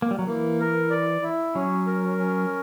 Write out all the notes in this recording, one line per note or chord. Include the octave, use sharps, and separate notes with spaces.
A#3
G3
F#3
E3 A#3
A#4
D5
E4
F#3 C#4
A#4
C#4